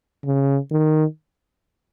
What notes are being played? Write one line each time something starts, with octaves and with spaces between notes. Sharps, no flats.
C#3
D#3